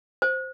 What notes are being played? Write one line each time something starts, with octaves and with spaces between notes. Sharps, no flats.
C5